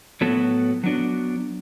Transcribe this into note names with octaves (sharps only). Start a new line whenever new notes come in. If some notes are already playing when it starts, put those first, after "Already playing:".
A2 F#3 B3 F#4 A4
F#3 B3 D4 F#4